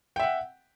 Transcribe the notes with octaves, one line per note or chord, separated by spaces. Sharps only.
E5 F#5 G5